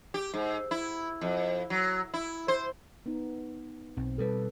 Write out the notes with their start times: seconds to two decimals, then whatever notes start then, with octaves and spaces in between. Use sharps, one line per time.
0.14 G4
0.34 G#2
0.71 E4
1.21 F2
1.70 F#3
2.14 E4
2.48 C5
3.06 B3 D#4
3.97 B1 C4
4.18 B2 G3 A4 B4